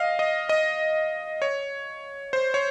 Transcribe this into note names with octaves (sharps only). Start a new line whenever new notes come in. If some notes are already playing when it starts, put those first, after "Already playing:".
Already playing: D#5 F5
D#5
D#5
C#5
C5
C#5